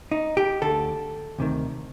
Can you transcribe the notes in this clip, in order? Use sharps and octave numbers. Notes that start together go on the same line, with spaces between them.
D#4
G4
D2 D3 A4
D2 C3 D#3